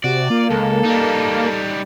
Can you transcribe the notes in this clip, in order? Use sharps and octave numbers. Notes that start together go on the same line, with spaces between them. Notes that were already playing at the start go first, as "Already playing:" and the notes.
C3 F#4 D5
A#3 F4
C#2 A4
G3 D#4